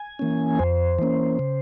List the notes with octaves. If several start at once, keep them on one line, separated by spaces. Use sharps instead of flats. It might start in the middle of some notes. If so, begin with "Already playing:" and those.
Already playing: G#5
E3 A#3 C#4
F2 C5
E3 A#3 C#4
C#3